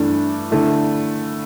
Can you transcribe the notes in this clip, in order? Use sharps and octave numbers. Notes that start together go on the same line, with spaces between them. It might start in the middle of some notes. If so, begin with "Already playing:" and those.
Already playing: G2 E3 A3 D4
D3 A3 E4